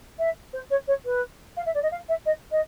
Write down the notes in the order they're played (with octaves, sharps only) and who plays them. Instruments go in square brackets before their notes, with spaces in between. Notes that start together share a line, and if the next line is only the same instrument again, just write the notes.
[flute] E5
C5
C#5
C#5
B4
F5
E5
D5
D#5
F5
E5
D#5
D#5